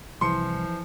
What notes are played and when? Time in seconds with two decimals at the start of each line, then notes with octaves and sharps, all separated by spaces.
0.21 C2 E3 F3 C6 C#7